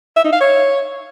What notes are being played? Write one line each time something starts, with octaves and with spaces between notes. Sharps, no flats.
E5
D#4
F5
C#5